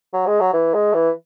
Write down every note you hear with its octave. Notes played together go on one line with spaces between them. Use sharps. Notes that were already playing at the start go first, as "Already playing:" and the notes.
F#3
G#3
F#3
E3
G#3
E3